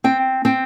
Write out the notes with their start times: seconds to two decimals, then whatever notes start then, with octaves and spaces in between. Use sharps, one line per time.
0.04 C4 G5
0.45 C4 G5